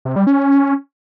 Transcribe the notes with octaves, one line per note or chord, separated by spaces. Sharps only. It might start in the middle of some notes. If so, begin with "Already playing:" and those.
C3
G3
C#4